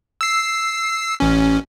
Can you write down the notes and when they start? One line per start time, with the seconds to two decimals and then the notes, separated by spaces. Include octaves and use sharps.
0.21 E6 C7
1.20 A1 C#4